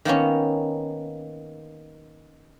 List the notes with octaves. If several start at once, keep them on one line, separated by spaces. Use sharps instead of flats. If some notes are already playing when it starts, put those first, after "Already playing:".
D#3 A#3 B3 C#4